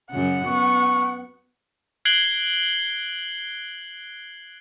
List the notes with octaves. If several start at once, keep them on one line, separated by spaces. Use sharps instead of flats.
F#2 C#3 F#5
B3 C#6
F#6 G#6 C7 D7 F#7 G7